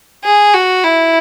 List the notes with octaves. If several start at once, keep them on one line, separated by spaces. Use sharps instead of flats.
G#4
F#4
E4